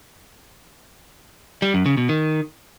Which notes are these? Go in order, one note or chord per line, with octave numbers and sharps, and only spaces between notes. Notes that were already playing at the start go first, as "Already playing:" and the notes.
G3
F#2
C#3
B2
D#3